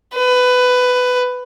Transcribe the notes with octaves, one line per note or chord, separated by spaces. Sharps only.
B4